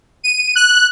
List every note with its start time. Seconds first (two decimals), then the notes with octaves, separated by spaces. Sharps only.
0.23 D#7
0.56 F#6